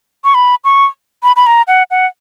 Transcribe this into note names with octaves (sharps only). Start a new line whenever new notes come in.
C#6
B5
C#6
B5
B5
A#5
F#5
F#5